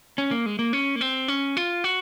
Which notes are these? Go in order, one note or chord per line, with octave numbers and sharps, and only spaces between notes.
C#4
A#3
G#3
A#3
C#4
A#3
C4
C#4
F4
F#4